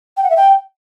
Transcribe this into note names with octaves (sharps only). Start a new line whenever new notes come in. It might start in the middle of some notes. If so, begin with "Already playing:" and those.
G5
F#5
E5
G5